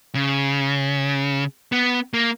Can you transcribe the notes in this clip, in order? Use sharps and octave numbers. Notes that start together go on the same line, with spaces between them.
C#3
B3
A#3